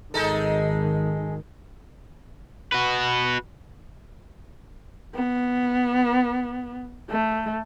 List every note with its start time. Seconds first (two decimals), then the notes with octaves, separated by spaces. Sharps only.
0.14 G#1 D#3 G#3 D#4 A4
2.72 F#4 B4
5.14 B3
7.10 A3